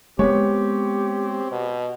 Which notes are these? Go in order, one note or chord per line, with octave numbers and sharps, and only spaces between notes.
G#3 A3 B3 C4 G4 C#5
B2